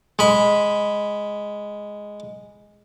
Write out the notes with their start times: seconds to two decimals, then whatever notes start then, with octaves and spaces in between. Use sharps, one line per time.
0.19 G#3 B5